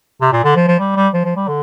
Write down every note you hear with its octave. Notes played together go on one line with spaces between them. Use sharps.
C3
A#2
D3
F3
F3
G3
G3
F3
F3
G3
D3